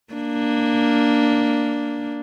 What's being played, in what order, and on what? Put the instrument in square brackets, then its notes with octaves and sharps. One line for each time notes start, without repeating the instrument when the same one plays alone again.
[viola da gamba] A#3 D4